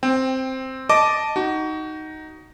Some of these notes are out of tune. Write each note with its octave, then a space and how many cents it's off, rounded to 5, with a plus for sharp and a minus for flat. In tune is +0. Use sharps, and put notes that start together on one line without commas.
C4 +0 G5 +15
D#5 +0 A5 +0 D6 +0
D#4 +0 F#4 +25